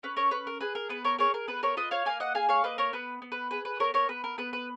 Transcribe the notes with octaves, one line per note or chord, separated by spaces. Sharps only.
C#4 B4
A#4 C#5
C#4 B4
A#4
G#4 B4
A#4
B3 B4
A#4 C#5
G#4 A#4 C#5
A#4
B3 B4
A#4 C#5
F4 B4 D#5
C#5 F5
A#3 F5 G#5
D#5 F#5
G#4 F5 G#5
C#5 F5
A#3 B4 D#5
A#4 C#5
B3 B4
B3
B4
G#4 B4
B4
B3 A#4 C#5
A#4 C#5
B3 B4
A#4
B3 B4
B4